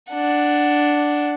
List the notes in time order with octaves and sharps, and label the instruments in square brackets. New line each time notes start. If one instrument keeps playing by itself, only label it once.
[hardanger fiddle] D4 F#5